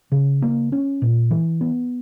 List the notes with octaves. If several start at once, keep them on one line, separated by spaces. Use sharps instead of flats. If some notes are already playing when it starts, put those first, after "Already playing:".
C#3
A#3
C#4
A#2
E3
B3